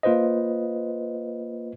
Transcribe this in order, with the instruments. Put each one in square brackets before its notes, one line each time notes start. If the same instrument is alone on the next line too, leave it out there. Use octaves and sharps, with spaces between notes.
[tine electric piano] A#3 F4 B4 C5 D#5